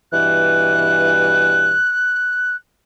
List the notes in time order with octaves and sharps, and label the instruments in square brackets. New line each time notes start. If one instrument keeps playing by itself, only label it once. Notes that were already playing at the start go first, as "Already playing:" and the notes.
[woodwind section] G2 B2 E3 [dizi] F#6